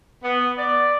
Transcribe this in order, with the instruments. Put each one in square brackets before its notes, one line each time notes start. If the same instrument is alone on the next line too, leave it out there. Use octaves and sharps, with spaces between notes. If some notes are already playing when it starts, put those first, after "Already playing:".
[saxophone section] B3
D5